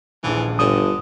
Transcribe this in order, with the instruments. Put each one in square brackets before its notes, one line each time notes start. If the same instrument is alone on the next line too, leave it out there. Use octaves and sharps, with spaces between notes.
[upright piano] D#1 A#1 G#4 [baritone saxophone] E3
[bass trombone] G1 [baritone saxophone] D3 [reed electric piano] D#6